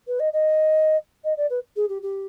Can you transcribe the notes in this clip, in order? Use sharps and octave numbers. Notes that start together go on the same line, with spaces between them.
B4
D#5
D#5
D#5
D5
B4
G#4
G4
G4